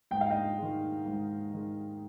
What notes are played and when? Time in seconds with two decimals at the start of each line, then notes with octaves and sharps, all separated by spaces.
0.11 G#2 G5
0.21 F5
0.31 D#5 G5
0.58 D#3 G#3
1.06 G#2
1.53 D#3 G#3